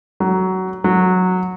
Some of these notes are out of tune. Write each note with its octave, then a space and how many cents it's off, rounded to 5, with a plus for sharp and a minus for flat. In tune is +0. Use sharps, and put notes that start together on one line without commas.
F#3 +15
F#3 -10